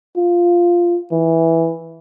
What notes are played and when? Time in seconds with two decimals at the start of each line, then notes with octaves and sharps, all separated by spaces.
0.17 F4
1.12 E3